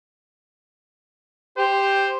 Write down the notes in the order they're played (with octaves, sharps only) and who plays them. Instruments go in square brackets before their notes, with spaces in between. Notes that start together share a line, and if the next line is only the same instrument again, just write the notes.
[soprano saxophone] G4 [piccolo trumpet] C5